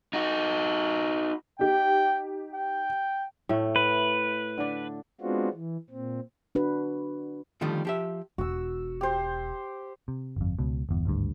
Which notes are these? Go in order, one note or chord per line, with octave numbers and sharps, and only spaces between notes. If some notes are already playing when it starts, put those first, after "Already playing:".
D#4 F#4
D#4 G4 G5
G5
A2 A3
B4
D3 D4
G#3 B3 C4 D4 F4 F#4
E3
A#2 C4
D4 F#4 B4
D3 D#3 F3 G3 A3
F3 G4 E5
E1 F#4 E6
G4 C5
C3
G1 F2
C#2 B2
G1 E2
G#1 D2 G2